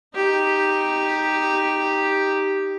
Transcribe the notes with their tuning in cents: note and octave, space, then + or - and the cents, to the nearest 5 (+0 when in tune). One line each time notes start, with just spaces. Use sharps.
D#4 +0 G4 +0